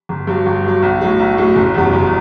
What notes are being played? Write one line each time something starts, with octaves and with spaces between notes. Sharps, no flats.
G1
G2 F#3
G1
G2 F#3
B1
A2 F#3
B1
A2 F#3
F#1
E2 B2 G3
F#1